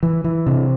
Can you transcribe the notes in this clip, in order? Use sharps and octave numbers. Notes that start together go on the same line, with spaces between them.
E3
E3
C3